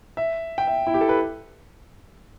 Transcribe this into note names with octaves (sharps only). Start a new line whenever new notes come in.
E5
G5
E5
E4
G4
A4
B4